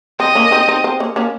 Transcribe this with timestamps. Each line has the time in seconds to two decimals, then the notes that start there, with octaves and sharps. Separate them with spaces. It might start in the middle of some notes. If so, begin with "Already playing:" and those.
0.19 C4 D#5
0.35 A#3 C#4
0.51 C4 D#4
0.68 C4 D#4
0.84 C4
1.00 A#3 C#4
1.16 A#3 C#4